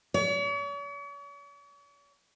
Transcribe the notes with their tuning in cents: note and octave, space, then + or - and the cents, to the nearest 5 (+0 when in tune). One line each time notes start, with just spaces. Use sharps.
C#5 +45